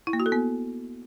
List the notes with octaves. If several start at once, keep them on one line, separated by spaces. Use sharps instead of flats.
E4
A#3
F#4
A4
B3